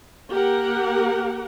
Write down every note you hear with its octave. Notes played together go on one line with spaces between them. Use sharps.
A#3 G4 A#4 F#5